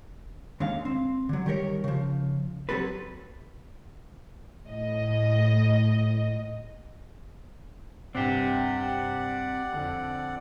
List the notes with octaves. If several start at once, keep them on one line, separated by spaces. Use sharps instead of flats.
D#2 D3 G#3 F5
C4
D3 F#3
D#3 G3 G4 A#4 C#5
C#3 F3
F#3 C4 G4 A4 B4
A2 D#5
G2 C3 C4 G4 D5 F#5
F2 D3